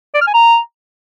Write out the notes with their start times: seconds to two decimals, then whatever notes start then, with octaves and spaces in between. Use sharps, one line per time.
0.14 D5
0.21 F6
0.27 G#5
0.34 A#5